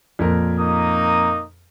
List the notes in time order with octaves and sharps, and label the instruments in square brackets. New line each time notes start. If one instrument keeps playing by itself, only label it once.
[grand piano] F2 A#2 A#4
[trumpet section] A#3 D#4 D#6